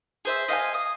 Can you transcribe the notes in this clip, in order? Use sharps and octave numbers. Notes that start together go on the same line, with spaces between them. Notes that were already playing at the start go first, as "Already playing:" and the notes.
G#4 C5 E5
D#5 F5 F#5 G#5
D#6